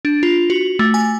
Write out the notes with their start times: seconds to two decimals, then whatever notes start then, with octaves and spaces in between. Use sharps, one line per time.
0.05 D4
0.23 F4
0.50 F#4
0.79 A3
0.94 G#5